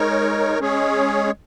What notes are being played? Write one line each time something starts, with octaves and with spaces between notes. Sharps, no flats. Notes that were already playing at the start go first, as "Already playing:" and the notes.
Already playing: G#3 D#4 A#4 C#5
G#3 C#4 G#4 C#5